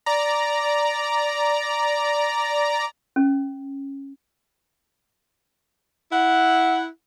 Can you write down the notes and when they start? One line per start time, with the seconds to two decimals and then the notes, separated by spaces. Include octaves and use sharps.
0.06 D5 A#5
3.16 C#4
6.12 E4 F#5